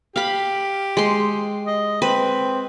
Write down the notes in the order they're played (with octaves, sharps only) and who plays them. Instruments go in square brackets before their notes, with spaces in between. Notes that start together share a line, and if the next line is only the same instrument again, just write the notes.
[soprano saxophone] G4 [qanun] F5 B5
[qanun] G#3 C6
[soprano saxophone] D#5
[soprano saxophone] C4 [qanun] B4